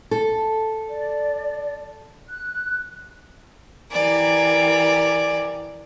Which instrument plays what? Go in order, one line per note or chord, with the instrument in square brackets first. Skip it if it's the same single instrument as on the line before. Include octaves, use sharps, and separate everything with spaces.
[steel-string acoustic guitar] A4
[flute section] D5
F#6
[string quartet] E3 G4 A#4 [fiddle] D5 G#5